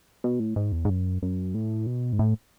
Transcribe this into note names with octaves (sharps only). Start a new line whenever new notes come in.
B2
A2
G#2
E2
G#2
F#2
F#2
A2
B2
G#2
A2